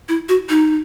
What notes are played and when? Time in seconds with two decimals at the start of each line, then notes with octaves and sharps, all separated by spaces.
0.09 E4
0.29 F#4
0.50 D#4